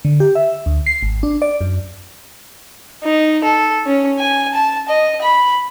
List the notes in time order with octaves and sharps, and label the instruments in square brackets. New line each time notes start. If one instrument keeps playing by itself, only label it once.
[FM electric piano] D3
G4
E5
D2
C7
G#1
D4
D5
F#2
[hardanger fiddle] D#4
A4
C#4
G#5
A5
D#5
B5